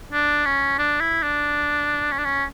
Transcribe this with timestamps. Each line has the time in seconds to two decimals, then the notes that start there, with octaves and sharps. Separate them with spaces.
0.13 D4
0.46 C#4
0.79 D4
1.01 E4
1.23 D4
2.12 C#4
2.18 D4
2.25 C#4